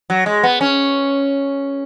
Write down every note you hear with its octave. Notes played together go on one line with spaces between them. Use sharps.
F#3
G#3
B3
C#4